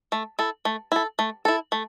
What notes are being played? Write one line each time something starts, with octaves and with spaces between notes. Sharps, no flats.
A3
E4 A4
A3
E4 A4
A3
E4 A4
A3